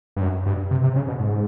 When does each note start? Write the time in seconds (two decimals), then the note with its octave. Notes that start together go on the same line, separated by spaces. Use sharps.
0.16 G2
0.21 F#2
0.46 G2
0.71 C3
0.83 C3
0.96 C#3
1.08 B2
1.20 G#2